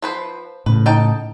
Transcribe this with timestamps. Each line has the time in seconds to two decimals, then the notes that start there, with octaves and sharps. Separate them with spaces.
0.02 F3 B4 C5
0.66 A2 C#3 B4
0.86 D#4 G5 A5